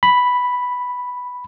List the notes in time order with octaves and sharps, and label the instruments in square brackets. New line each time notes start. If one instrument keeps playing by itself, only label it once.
[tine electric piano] B5